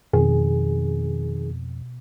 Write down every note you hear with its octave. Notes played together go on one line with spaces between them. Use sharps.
F2 B2 D#3 G#4